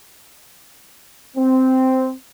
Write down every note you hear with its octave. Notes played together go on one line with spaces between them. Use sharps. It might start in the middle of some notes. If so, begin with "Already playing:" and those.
C4